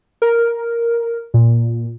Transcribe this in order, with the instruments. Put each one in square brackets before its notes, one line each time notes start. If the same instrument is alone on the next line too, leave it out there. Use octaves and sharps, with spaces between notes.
[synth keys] A#4
A#2